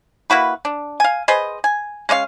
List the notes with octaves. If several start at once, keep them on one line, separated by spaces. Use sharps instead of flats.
A#3 E4 F#4 B4
D4
F5 G#5
G#4 B4 C5 D#5
G#5
G#3 C#4 C#5 F5